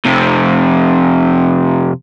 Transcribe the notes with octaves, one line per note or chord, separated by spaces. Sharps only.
F2 C3